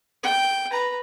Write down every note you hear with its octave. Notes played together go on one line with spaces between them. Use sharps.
G5
B4 A#5